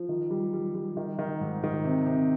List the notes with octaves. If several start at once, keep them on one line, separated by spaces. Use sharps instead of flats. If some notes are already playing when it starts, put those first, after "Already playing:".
Already playing: F3
D#3
G3
G3
G3
D#3
D#3
G#2
D#3
C3
C3